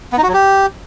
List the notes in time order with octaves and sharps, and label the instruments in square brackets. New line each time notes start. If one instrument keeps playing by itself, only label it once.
[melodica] B3
D#4
F#4
F#3
G4